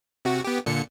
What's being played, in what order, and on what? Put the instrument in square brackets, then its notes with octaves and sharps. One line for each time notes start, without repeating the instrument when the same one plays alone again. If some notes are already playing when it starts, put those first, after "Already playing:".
[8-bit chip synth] C3 F#4
B3 G4
A#2 D3 C#7